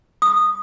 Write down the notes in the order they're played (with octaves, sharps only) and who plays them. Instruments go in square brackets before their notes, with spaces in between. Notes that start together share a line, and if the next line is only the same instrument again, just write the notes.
[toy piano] D#6